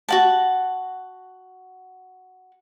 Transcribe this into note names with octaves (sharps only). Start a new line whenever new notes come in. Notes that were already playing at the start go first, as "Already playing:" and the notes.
F#4 F#5 A5